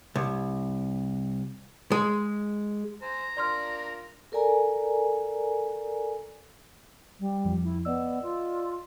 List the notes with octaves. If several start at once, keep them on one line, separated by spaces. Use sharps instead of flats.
C2
G#3
C5 G#5 A#5
D4 F4 A#4 D5 C6 F6
A4 A#4 D5 G#5 A#5
G3
F2 F3
E4
B3 D5 D#5 E6
F4